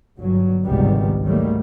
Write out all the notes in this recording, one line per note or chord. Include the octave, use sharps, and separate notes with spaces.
G1 F#3
G#1 C#2 C3 D#3 G3 B3
G#2 D#3 F#3 G3 A3 A#3